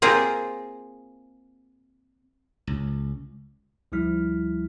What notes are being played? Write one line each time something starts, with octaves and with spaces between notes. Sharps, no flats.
A#3 C4 F4 G#4
C#2
D2 F3 G3 E4 F6 B6